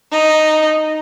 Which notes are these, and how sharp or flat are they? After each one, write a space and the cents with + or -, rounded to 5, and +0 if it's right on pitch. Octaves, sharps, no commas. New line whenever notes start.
D#4 -5